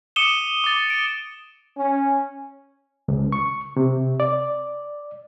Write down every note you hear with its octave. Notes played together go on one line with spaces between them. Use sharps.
D6 D#6 C#7 D#7 E7 G7
D6 A6
D7
C#4
C#2
C#6
C3
D5